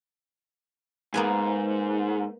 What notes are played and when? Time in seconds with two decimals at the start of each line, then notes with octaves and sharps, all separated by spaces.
1.14 G#2 A#3 B3 G#5